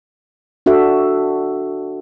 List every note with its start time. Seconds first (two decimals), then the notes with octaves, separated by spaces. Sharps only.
0.66 D4 F#4 A4 E5